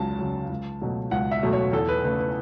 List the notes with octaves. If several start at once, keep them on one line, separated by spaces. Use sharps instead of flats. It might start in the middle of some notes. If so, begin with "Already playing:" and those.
Already playing: C#2 C#3 F#3 A5
C#3 F#3
C#2
B2 F#3 A3
C#2 F#5
E5
B2 F#3 A3
C#5
E2 A4
B4
C#3 A3 B4
B4